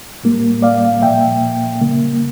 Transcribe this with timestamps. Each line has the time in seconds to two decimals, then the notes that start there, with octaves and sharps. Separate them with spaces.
0.23 A2 G3 A#3
0.62 D5 F5
1.02 A#2 F3 A#3 E5 G5
1.81 C#3 G3 A#3